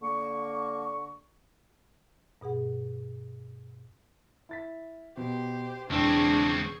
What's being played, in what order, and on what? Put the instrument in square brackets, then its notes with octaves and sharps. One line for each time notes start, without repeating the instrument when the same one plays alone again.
[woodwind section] D3 A#3 C#6
[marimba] G2 B2 G#4 F#5
[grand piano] E4 A6 B6
[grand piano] B2 [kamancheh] G4 C5
[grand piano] E1 E3 E6 [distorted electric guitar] C#2 C4 [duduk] D4 [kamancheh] G#4 C#6